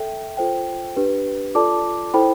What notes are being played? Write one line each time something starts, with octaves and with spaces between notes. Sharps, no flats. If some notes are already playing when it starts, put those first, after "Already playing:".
Already playing: A4 E5 G5
F4 A4 C5 G5
D4 G4 B4
F4 A4 D5 A5 D6
E4 A4 C5 G5 B5